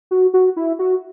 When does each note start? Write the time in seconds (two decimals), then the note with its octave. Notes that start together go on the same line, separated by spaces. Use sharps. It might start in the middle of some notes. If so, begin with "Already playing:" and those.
0.11 F#4
0.34 F#4
0.56 E4
0.79 F#4